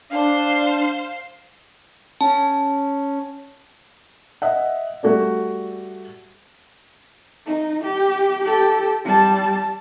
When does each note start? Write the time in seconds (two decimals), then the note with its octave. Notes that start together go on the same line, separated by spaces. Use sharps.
0.10 D4 C5 F5
2.21 C#4 A5
4.42 D#5 E5 F#5
5.03 G3 A3 F#4 A4 D5
7.45 D#4
7.83 G4
8.44 G4 A4
9.04 G3 A5